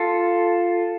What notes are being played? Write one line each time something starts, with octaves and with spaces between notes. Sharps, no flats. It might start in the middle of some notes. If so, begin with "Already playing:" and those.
Already playing: F4 A4